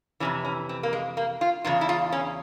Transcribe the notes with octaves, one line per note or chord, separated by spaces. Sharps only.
F2 C3 E3 C#4
C#4
C4
A#3
G#3
A#3
F4
E2 C#3 F4
E4
F4
C#4